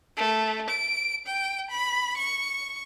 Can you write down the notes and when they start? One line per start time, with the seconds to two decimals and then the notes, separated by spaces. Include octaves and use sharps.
0.17 A3
0.70 D7
1.26 G5
1.70 B5
2.17 C#6